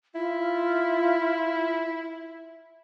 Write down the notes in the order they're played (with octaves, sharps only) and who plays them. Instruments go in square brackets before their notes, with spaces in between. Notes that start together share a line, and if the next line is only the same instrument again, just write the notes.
[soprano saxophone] E4 [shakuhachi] F4